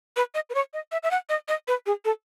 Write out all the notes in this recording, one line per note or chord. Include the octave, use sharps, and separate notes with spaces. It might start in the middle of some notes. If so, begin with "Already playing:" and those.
B4
D#5
B4
C#5
D#5
E5
E5
F#5
D#5
D#5
B4
G#4
A4